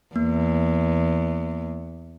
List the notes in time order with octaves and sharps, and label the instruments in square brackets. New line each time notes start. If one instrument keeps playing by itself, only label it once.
[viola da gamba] E2 [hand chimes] A#3